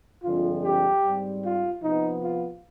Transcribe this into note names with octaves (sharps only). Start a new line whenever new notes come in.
G2 D3 F3 G#3 C4 F4
G4
G#2 G3 C4
F4
C3 F3 B3 D#4
F4